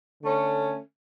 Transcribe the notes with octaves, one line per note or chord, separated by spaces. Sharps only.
D3 A3 C#4